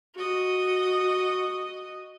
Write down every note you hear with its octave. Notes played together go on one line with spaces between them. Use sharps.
F#4 D#5